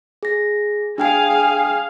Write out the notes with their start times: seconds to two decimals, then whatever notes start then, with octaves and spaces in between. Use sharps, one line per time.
0.23 G#4 A#6
0.98 D4 G#4 F5 G5 G#5